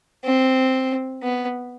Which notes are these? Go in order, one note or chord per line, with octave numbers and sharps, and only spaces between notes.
C4
B3